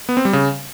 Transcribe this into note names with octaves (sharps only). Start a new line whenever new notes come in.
B3
C4
G3
C#3